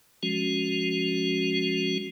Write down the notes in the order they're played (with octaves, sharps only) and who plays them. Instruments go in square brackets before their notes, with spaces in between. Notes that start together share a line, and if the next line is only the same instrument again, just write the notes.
[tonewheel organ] F3 G#3 C#4 F#4